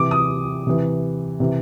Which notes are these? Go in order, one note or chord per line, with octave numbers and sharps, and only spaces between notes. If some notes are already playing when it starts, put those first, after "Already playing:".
Already playing: C3 E3 D6
D#6
C3 E3
C3 E3